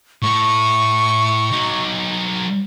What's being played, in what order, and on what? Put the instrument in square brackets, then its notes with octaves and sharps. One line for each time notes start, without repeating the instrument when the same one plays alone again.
[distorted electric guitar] A2 [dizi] C#6
[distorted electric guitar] F#3 D#4